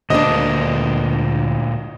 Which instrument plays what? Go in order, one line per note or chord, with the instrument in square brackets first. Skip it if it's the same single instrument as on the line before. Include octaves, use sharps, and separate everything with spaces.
[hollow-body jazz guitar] D2 D4 [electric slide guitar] A#2 G#3 A#3 [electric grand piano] D#5